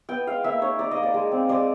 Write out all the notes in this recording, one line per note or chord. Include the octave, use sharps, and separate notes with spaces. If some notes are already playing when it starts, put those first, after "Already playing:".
B3 G5
G#3 F5
A#3 E5
D#4 C#5
D#4 D5
D#5
A#3
D5
G#3
C4
G#3 D5